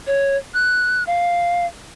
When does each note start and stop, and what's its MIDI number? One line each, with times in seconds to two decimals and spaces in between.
0.07 0.37 73
0.54 1.04 90
1.07 1.66 77